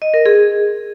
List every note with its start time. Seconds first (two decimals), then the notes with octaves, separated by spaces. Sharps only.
0.02 D#5
0.14 A#4
0.26 G#4